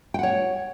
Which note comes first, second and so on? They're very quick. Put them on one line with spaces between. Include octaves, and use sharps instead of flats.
G5 F#5 C#5